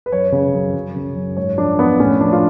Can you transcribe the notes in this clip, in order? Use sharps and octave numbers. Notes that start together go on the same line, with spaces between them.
B4
F#2 C#5
C#3
F#2
F#2
C#3
F#2
G#2 C#5
F3 D4
F3 B3
A2 C#4
F3 D4
F4